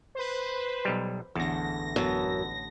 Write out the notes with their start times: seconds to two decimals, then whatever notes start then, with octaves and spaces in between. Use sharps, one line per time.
0.15 B4 C5
0.85 B1 G3
1.35 A1 E2 D3 A4 A#6
1.96 F#2 B3 A4